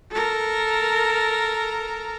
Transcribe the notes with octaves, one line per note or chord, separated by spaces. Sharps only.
A4 A#4